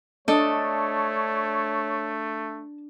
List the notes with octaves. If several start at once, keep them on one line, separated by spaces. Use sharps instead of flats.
A3 D4 A4 C#5 D#5